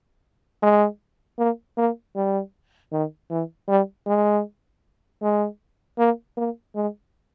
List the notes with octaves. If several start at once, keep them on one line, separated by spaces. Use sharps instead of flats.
G#3
A#3
A#3
G3
D#3
E3
G3
G#3
G#3
A#3
A#3
G#3